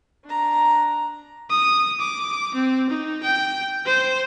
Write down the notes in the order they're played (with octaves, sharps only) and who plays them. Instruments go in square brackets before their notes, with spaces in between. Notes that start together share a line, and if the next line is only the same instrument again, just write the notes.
[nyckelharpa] D4 A#5
[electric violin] D#6
D6
C4
D#4
G5
C5